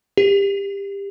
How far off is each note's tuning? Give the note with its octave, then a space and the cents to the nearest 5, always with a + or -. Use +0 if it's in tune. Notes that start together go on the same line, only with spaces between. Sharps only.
G4 +20